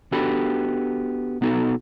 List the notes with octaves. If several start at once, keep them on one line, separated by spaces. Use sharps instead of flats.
B3 D4 F#4 G4 A4 B5
B1 B3 D#4 F#4 A4